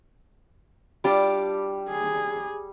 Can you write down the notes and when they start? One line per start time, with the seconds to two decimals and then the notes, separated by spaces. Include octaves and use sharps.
1.04 G3 D4 F4 G4
1.89 G#4